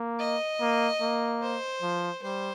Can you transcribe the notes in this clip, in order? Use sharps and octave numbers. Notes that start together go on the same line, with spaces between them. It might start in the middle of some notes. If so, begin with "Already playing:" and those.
Already playing: A#3
D#5
A#3
A#3
C5
F3
G3 C5